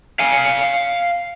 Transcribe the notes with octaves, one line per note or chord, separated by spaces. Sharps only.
F5 G#5